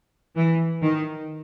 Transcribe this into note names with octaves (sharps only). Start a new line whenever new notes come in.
E3
D#3